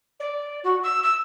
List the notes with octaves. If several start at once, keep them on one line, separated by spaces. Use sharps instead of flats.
D5
F#4
E6
E6